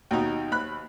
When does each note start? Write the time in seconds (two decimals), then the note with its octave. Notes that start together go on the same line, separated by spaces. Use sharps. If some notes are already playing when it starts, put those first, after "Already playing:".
0.11 D#2 B2 D#4
0.51 D#2 B5 F#6